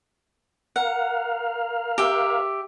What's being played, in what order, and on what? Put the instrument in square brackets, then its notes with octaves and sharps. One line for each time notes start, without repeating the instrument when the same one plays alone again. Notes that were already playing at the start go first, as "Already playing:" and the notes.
[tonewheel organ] A#4 F5 [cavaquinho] F#5
[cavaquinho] G4 E5